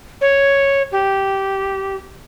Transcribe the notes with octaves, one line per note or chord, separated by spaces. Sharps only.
C#5
G4